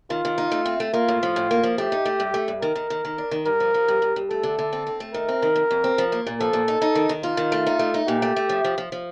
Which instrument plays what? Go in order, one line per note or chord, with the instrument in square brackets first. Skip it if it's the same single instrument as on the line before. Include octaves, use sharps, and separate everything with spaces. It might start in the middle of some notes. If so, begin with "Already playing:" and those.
[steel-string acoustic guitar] D#3 [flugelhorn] F4
[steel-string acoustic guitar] D#3
D#4
A3
C4
A3
[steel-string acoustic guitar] A#3 [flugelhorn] F4
[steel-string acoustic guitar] A2
F3
A2
A#3
F3
[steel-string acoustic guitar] A3 [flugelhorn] G4
[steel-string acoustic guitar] D#4
A3
G2
A3
G2
[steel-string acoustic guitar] D#3 [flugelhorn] A#4
[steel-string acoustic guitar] D#3
D#3
D#3
D4
D#3
[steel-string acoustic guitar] G2 [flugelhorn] A#4
[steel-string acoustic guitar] F3
F3
G2
G2
G2
[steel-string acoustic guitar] A3 [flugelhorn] A4
[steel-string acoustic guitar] D3
D3
C4
C4
A3
[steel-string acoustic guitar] D#3 [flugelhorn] A#4
[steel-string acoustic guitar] C4
D#3
F2
F2
C4
F3
A#3
A#2
[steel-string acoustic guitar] F3 [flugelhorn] A4
[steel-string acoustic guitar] A#2
D#4
D#4
D#3
D#3
[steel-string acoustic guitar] D#4 [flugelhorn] F4
[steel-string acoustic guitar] D#3
A3
D#4
A3
D#4
[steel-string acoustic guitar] A#2 [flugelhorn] G4
[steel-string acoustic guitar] A3
A3
F3
F3
F3
F3